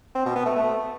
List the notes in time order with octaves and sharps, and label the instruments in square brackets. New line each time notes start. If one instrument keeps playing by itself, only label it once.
[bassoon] C4
B2
B3
A3
A3